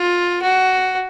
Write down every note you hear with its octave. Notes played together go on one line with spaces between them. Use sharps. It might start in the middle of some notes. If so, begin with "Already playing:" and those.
Already playing: F4
F#4